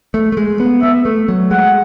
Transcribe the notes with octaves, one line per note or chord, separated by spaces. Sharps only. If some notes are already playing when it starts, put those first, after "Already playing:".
A3
A3
G#3
B3
B3 E5
A3
F#3
G#3 F#5